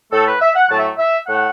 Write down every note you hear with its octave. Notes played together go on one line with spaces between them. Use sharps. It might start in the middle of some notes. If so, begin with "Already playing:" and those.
A2 A3 A4
B4
E5
F#5
A2 F#3 A3 A5
E5
E5
A2 A3 F#5